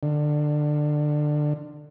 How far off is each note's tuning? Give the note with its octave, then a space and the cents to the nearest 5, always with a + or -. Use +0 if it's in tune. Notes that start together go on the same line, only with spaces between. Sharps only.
D3 +20